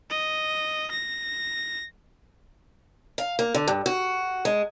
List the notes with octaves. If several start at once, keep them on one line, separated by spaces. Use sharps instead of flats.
D#5
A#6
F5
A#3
D3
G2
F#4
G#3